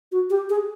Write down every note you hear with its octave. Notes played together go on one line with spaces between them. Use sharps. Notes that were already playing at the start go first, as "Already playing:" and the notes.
F#4
G4
G#4